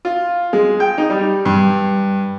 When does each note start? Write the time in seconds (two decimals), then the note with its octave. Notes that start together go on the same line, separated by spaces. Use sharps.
0.05 F4
0.53 G#3
0.80 G5
0.98 D#4
1.10 G3
1.45 G2